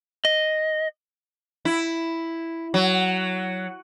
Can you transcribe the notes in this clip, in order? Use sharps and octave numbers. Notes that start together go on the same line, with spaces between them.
D#5
E4
F#3